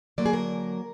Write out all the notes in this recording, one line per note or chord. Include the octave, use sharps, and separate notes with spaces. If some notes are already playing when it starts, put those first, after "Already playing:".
D3 F#3 A#3 D5
G#4
A#4